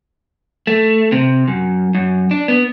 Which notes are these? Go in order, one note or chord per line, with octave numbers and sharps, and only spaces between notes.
A3
C3
F#2
F#2
D4
B3